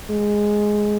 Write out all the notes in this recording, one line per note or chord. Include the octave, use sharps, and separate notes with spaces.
G#3